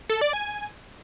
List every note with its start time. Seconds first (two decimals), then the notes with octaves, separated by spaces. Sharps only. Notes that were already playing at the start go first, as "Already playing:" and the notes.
0.10 A4
0.21 D5
0.33 G#5